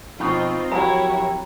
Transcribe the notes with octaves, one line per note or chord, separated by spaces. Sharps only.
F2 B2 C4 D#4 F4
F2 F#3 E4 F#4 G4 A#4 C#5 A#5